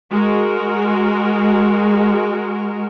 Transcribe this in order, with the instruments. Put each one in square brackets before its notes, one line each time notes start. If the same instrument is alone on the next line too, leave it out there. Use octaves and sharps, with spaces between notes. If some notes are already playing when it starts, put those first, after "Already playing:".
[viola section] G#3 F#4 A#4